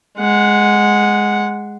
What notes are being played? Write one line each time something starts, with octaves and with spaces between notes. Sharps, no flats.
G#3 F#5